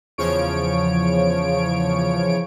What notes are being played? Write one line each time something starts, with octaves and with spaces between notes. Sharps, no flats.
E2 C#3 F3 C#5 D7